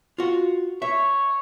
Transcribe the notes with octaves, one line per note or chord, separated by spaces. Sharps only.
F4 F#4
C#5 E5